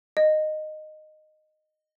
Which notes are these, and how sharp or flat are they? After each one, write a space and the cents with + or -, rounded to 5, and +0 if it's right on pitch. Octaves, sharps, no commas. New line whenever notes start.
D#5 -10